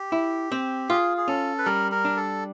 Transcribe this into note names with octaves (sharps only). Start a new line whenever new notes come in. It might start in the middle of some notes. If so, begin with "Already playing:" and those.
Already playing: G4
E4
C4
F4 G#4
G#4
C#4 A4
B4
G3 A#4
A#4
D4
A4